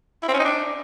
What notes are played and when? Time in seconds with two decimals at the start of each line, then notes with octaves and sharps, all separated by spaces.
0.23 E4
0.28 C4
0.34 C#4
0.39 D#4
0.45 D4